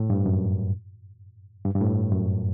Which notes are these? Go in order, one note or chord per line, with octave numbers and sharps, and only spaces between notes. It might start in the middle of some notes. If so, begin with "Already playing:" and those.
Already playing: A2
G2
F#2
G2
G2
A2
F#2